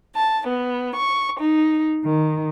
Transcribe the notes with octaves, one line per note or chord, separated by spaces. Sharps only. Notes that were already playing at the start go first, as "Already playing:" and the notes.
A5
B3
C#6
D#4
D#3